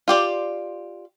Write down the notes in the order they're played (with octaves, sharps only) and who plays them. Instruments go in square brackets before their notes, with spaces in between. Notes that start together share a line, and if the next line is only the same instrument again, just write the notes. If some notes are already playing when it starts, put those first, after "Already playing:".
[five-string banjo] F4 G4 D5